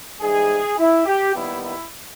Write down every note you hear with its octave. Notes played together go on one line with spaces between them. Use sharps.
G#2 E3 G3 G#4
E4
G4
D#2 D#3 G3 B3 D#4 E4
E4